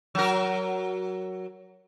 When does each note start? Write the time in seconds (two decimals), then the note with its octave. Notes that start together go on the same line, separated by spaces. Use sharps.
0.15 F#3 A#4